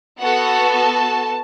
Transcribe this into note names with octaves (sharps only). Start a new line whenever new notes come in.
B3 F#4 A4 F#5
A5